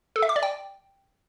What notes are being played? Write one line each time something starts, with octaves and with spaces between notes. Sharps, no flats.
A4
E5
D6
D5
G5